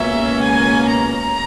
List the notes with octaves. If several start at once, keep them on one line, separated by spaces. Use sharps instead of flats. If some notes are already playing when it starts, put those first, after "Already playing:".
Already playing: C#2 B2 A#3 C#4 E5
G#5
A#5